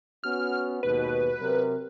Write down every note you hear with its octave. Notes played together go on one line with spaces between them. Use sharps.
B3 C#4 F#4 F6
D#2 G#2 B2 B4
C3 F#3 A#4